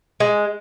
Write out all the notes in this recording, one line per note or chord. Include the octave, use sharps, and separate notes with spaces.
G#3